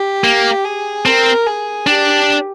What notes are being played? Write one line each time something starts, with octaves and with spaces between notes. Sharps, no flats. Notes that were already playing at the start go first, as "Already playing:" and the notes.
Already playing: G4
A#3
G#4
C4 A#4
G#4
D4 G4